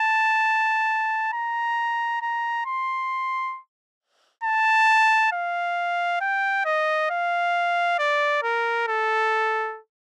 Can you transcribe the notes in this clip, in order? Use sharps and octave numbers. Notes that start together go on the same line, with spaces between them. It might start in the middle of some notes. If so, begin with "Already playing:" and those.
Already playing: A5
A#5
A#5
C6
A5
F5
G5
D#5
F5
D5
A#4
A4